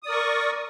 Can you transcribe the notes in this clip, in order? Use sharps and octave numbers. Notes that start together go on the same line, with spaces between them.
A#4 D5 C#6 D#6